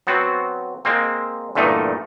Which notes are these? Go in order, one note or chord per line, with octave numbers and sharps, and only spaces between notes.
F#3 B3 C4 F#4
G#3 A#3 C4
E2 G2 A#2 A3 D#4